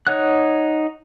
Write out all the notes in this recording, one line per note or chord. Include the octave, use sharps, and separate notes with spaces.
D#4 C#5 F#5 F#6